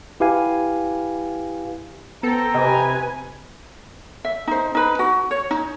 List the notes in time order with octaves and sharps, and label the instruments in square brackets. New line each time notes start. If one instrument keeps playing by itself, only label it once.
[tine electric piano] E4 G4 B4 F5 G#5
[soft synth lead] B3 [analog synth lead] A4 [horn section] C5 G5 A#5
[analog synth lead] C3 [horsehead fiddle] B4 G#5 [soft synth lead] D#5
[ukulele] E5
D#4 C5
D#4 B4
F#4
C#5
D#4